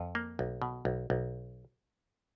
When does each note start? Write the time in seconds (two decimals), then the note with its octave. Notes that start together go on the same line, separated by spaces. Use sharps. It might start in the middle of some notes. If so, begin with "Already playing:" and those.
Already playing: F2
0.15 A#3
0.39 B1
0.62 B2
0.85 B1
1.10 B1